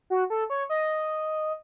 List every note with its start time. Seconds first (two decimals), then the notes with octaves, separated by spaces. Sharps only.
0.10 F#4
0.30 A4
0.50 C#5
0.69 D#5